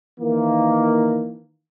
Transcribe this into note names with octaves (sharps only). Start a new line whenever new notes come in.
D#3 E3 A#3